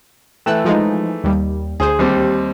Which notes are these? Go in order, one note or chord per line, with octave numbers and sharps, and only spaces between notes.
E3 A3 G5 E6 F#6
F3 G#3 D#4
D#2 G3
D2 G#4 C5
D#2 G3 C4